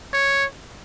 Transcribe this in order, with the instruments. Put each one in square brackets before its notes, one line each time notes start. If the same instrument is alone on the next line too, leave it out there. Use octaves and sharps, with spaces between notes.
[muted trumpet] C#5